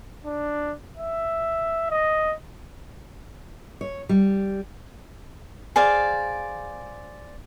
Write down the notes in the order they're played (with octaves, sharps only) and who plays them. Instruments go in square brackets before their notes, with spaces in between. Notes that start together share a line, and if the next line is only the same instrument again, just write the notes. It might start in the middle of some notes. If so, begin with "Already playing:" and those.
[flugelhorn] D4
E5
D#5
[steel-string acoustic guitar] C#5
G3
[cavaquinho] G#4 C5 D5 F5